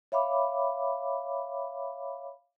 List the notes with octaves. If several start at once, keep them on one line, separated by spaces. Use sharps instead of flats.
C#5 E5 F5 B5 D6